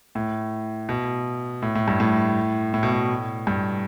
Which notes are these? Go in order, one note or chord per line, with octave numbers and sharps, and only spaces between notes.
A2
B2
A2
A2
G2
A2
A2
B2
A2
G2